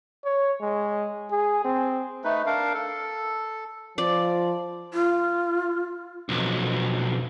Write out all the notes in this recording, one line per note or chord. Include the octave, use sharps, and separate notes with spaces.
C#5
G#3
G#4
C4
A3 D#4 B4
D4 A#4 F5
A4
F3 D5
F4
B1 F2